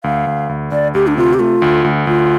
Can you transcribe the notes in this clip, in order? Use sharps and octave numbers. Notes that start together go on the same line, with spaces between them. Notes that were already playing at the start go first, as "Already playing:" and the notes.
D2 F5
D2
D2
D2 D5
D2 G4
D4
C3 F4
G4
A3 F4
D2
D2
D2 F4